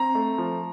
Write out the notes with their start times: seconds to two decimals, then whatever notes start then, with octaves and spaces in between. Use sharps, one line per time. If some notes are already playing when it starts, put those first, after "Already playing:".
Already playing: C4 A#5
0.15 A3
0.38 F3